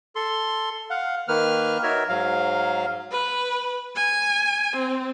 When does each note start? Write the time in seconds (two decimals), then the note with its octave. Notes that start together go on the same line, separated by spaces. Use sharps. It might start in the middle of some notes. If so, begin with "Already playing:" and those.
0.16 A4 C6
0.90 F5 F#5
1.28 D#3 A#3 B4 F6
1.83 D#4 F#4 A#4 C#5 E5
2.09 G#2 F#3 F5
3.11 B4
3.96 G#5
4.76 C4